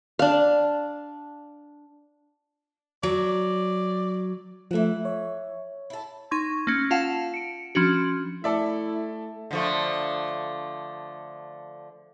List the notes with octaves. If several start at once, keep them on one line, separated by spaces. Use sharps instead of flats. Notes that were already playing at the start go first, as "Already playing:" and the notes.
D4 F5
F#3 D5
E3 F3 A3 E5 F#5
C#5
E4 A4
D#4 C6 C#6 G#6
A#3 C#4
F4 F5 F#5 A5 E7
C#7 D7
F3 C#4 D4 F#4
A3 E4 A4 D5 E5
D3 F3 A3